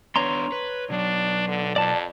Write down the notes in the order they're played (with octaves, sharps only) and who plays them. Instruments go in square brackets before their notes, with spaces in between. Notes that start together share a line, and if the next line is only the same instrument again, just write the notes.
[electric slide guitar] B3 D4 B4 [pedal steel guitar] C#5 A#5 C6
[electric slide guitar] B4
[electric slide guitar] B2 F#3 [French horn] D4
[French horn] D3
[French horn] F2 [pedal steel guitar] D5 A5